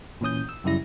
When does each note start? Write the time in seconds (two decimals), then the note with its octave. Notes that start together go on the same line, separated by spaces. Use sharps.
0.21 A#2 E3 C#4 D#6 G6
0.49 E6
0.64 F#2 C#3 G3 E4 A#6